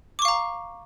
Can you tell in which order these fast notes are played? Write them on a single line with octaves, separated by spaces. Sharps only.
D6 C#6 F5 A#5